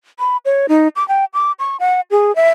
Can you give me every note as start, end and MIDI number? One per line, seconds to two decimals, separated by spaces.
0.19 0.37 83
0.45 0.66 73
0.69 0.88 63
0.96 1.06 86
1.08 1.25 79
1.34 1.52 86
1.59 1.77 85
1.80 2.01 78
2.11 2.35 68
2.36 2.49 76